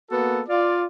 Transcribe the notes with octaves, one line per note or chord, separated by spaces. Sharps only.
A#3 B3 F#4 A4
F4 D5